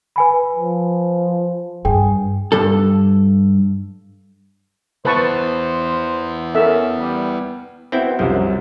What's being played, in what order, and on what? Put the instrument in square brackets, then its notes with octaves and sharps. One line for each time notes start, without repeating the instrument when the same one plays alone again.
[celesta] B4 G#5 B5
[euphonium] F3
[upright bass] G2 [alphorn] G#4 [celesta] G5
[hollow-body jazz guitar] G2 A4
[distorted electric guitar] B3 E4 [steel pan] B4 A5 C#6 [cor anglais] C5
[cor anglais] C#4 [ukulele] A4 A#4 [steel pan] E5
[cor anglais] G3
[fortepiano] B3 F#4 [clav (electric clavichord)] C4 E4 G5
[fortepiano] C2 F#2 G3 [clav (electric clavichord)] F3